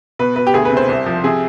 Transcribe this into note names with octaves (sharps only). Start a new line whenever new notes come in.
B2 B4
B2 B4
G4
D2 G#4
B4
C3
C5
C2
F3
C3 G#4